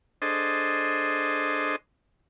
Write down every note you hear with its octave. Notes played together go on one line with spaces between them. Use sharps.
D4 G#4 A4 C5 D#5